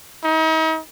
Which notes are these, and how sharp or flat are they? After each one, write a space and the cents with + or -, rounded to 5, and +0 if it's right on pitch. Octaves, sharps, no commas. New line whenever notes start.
D#4 +40